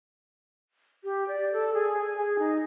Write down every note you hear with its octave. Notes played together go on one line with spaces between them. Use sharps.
G4
D5
A4
G#4
G#5
G#4
D#4